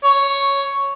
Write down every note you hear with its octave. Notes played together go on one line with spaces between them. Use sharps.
C#5